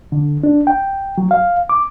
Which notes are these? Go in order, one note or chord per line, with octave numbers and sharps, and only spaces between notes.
D3
D4
G5
F#3
F5
D6